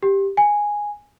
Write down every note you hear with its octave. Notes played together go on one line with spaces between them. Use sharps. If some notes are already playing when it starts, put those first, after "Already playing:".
G4
G#5